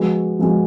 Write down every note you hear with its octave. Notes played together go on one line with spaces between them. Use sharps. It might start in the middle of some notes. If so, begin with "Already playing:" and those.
Already playing: F3 G#3 B3 F#4
F3 G#3 B3 F#4